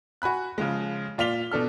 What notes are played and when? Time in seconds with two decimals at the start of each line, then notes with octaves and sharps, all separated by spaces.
0.22 F#4 G#5 B5 F#6
0.58 C#3 F3 G#3
1.18 A#2 F4 D5 B6 F7 G7
1.51 B2 D4 A4 F6